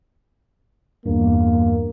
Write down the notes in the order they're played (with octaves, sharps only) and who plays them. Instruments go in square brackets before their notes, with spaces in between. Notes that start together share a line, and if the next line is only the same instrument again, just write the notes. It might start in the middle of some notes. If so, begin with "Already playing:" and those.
[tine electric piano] E2 G2 [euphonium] A#3